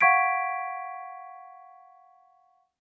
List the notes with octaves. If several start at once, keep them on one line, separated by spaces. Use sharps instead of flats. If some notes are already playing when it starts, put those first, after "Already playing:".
F5 F#5 C#6 G#6 B6 D7